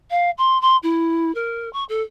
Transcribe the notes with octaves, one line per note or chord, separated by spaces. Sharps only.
F5
C6
C6
E4
A#4
C#6
A4